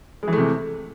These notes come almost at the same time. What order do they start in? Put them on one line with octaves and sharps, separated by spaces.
G#3 E3 A3 C3